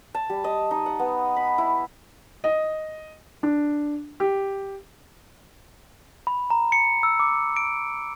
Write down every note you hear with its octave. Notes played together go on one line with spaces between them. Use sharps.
A5
G3
D#5
D#4
F#5
B3
B5
E4
D#5
D4
G4
B5
A#5
C#7
E6
D6
D7